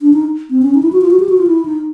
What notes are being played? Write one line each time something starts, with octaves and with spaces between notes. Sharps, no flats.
D4
D#4
C4
C#4
D#4
E4
F#4
F4
F#4
G4
F#4
F4
E4
D#4